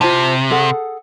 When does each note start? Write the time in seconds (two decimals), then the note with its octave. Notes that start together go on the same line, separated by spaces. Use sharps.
0.01 C3 F4 C5 A5
0.50 G#4 A4 F#5